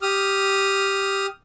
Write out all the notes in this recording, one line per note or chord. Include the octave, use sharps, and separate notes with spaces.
G4 D#6 F6